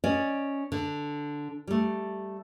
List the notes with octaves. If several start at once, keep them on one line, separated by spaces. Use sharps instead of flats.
C#4 D5 D#5
D3
G3 A3